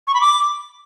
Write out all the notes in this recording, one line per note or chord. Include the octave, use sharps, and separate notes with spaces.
C#6
B5
D6